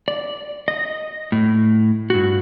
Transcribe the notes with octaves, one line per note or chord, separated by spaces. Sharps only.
D5
D#5
A2
G2 F#4